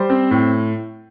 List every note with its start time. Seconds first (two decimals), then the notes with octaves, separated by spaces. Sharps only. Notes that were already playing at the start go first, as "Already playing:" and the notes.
Already playing: G3 C5
0.10 C4
0.31 A2